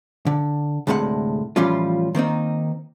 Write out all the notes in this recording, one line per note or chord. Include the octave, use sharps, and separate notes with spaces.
D3
D2 A2 C3 G#3 B4 F#5
A2 E3 F3 G3 C#4 F4
D#3 A#3 C4 D#4